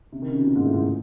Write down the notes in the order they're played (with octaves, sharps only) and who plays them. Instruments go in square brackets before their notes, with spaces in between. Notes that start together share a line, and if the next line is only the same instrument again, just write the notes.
[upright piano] C3
D#3
C#3
B2
A#2
G#2
A2
G#2